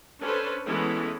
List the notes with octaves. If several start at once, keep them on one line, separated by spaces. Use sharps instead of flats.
C#4 D4 A4 B4 C5
E3 G#3 A3 B3 C#4 E4